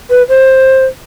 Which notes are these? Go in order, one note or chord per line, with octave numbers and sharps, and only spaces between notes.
B4
C5